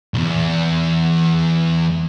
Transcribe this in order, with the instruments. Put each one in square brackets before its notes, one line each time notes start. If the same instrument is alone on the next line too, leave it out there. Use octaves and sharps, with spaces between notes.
[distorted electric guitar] B1 E2